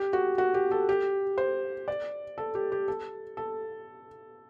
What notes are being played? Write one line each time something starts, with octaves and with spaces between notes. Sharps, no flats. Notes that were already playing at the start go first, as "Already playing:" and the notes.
Already playing: G4
F#4
F#4
G4
A4
G4
C5
D5
A4
G4
G4
A4
A4